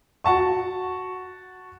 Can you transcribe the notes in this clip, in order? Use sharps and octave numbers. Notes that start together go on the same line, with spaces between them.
F#4 F#5 A5 C#6